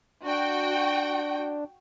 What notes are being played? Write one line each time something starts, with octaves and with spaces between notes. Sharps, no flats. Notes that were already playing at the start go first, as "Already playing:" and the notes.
D4 F#4 G5